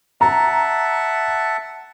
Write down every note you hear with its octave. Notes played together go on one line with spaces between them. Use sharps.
E5 F#5 A5 A#5